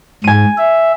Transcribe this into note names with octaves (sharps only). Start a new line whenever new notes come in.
G#2 G#5 D#7
E5